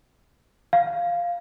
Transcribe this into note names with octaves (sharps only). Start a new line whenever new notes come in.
F5